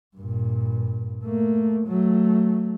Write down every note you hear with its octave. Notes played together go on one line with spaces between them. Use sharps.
G2 A#2
A3 A#3
F#3 A3